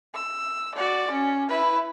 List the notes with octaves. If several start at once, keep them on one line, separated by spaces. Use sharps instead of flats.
E6
F#4 D5
C#4
E4 B4